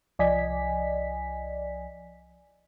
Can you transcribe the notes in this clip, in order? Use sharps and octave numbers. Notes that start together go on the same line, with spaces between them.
C2 F3 D5 D#5 G#5 B6